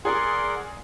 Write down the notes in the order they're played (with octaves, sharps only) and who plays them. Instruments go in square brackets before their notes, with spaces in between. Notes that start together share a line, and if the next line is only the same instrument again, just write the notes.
[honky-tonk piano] G#4 [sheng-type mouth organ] A#4 D5 F#5 [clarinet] C6